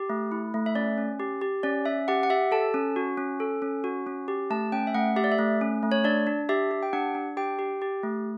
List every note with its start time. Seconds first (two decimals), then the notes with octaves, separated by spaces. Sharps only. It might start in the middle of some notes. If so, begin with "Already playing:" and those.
Already playing: G4
0.09 A3
0.32 E4
0.54 A3
0.66 E5
0.75 C#4 D5
0.98 C#4
1.20 G4
1.41 G4
1.63 C#4 D5
1.86 C#4 E5
2.08 G4 F#5
2.23 F#5
2.30 G4 E5
2.52 A4 A5
2.74 C#4
2.96 F#4
3.17 C#4
3.40 A4
3.62 C#4
3.84 F#4
4.07 C#4
4.28 G4
4.50 A3 A5
4.72 C#4 G5
4.87 E5
4.94 A3 F#5
5.16 G4 E5
5.24 D5
5.32 E5
5.39 A3
5.61 C#4
5.83 A3
5.92 C#5
6.04 D4 D5
6.27 D4
6.49 G4 E5
6.71 G4
6.83 G5
6.93 D4 F#5
7.15 D4
7.37 G4 G5
7.59 G4
7.82 G4
8.03 A3